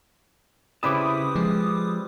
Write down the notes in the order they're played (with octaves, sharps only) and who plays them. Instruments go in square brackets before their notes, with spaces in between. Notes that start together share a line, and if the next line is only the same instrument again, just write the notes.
[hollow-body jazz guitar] C#3 E4 A5 [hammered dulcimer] G3 C4 B4 [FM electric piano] D6 D#6
[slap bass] F3 [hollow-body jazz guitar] G#3